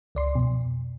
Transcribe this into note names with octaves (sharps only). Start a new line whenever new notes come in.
C#2 D5 C6
F2 B2